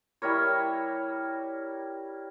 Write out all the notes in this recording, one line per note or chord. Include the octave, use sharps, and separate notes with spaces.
G3 E4 A#4 C#5